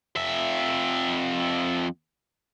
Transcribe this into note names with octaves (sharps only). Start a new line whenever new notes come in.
F2 E5